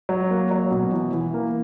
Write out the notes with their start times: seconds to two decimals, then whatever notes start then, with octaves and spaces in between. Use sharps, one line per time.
0.09 F#3
0.30 A#3
0.51 F#3
0.71 B2
0.92 E3
1.13 E3
1.34 A#3